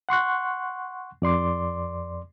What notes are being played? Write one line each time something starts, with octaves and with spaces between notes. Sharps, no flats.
F#5 C6 C#6 F#6
F2 D5 C6 D6